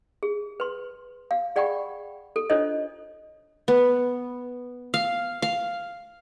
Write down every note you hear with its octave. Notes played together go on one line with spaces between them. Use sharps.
G#4
B4 C6
F5
G#4 D5 F#5 G5 B5 C#6
A4
D4 F4 A4 C5 C#5 D#5
B3
F5
F5